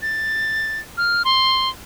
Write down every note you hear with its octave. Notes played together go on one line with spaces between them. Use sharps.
A6
F6
C6